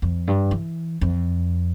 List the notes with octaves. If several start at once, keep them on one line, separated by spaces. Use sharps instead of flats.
F2
G2
E3
F2